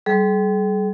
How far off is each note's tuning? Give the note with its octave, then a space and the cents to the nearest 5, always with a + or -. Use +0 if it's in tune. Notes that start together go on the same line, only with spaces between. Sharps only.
G3 -20 G#4 +45